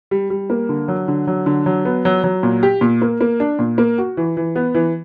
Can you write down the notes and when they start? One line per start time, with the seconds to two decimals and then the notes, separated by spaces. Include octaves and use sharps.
0.11 G3
0.30 G3
0.50 A#3
0.69 D3
0.88 F#3
1.08 D3
1.27 F#3
1.46 D3
1.66 F#3
1.85 B3
2.05 F#3
2.24 F#3
2.43 A#2
2.63 G4
2.81 A#2
3.02 A#3
3.21 A#3
3.40 D4
3.59 A#2
3.78 A#3
3.98 F#4
4.17 E3
4.37 E3
4.56 B3
4.74 E3